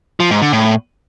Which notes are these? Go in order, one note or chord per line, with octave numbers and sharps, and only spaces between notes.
F3
G#2
D3
A2